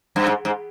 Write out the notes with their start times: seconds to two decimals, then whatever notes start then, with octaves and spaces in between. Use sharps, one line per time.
0.16 G2
0.27 G#2
0.45 G#2